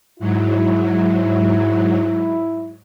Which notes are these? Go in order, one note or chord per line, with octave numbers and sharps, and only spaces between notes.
G#2 F#3 E4